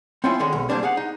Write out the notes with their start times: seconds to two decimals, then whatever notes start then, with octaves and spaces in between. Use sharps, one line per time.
0.24 C4 C#4 E4 F4 G#5
0.39 D3 D#3 G#3
0.53 B1
0.69 G3 A#3 C4 D4 G#4
0.83 G#4 F5 F#5
0.97 D#4